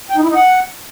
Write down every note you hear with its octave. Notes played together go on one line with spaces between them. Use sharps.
G5
D#4
E4
D#4
F#5